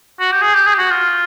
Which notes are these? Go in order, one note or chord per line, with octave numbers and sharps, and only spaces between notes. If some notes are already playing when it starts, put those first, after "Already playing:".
F#4
G4
G#4
G4
G#4
G4
F#4
F4